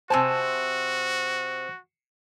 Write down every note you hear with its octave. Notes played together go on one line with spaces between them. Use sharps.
C3 F#4 C5 G#5 A5 E6